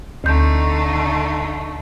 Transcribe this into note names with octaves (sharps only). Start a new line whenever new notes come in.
D2 D3 A3 D#4 G6